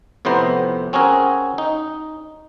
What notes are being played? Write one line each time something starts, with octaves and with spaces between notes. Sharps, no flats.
F2 A2 C3 B3 C5 A#5
C4 C#4 F#4 G#4 A#4
D#4